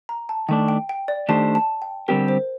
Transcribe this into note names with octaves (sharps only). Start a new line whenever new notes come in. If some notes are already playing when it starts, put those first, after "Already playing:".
A#5
A5
D#3 A3 D4 G5
G5
G5
D5
D#3 A3 D4 G4 C5 A5
A5
G5
D3 G3 C4 G4 A#4
C5